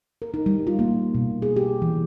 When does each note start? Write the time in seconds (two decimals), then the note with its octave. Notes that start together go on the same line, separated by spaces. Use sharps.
0.22 A#4
0.34 D#4
0.46 G3
0.67 F4
0.79 A#3
1.15 B2
1.42 G#4
1.56 G4
1.82 E3